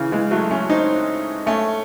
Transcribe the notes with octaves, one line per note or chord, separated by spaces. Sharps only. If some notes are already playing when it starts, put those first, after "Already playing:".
Already playing: C#3 E3
E3 G#3
F#3 A3
A3 C#4
C4 D#4
A3 C#4